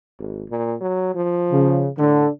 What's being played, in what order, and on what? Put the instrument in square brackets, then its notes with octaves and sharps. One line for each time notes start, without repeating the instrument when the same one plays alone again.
[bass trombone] G#1
A#2
F#3
F3
[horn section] C#3
[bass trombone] A2 [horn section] D3